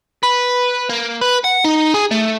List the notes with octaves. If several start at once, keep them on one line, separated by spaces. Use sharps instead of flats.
B4
A#3
B4
F#5
D#4
G#4
A3